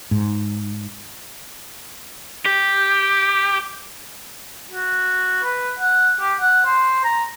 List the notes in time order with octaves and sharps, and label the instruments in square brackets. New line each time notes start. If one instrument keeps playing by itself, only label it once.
[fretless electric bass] G#2
[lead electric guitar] G4
[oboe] F#4
B4
F#5
G4
F#5
C5
A#5